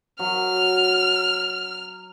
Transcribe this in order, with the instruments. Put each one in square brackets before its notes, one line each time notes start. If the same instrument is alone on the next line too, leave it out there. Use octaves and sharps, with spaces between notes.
[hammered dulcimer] F#3 [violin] F6